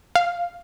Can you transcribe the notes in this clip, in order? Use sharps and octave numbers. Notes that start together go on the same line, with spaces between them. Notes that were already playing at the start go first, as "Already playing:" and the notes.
F5